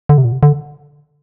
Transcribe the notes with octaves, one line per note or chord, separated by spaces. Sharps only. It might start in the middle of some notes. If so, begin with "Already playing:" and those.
D3
C3
A#2
C3
D3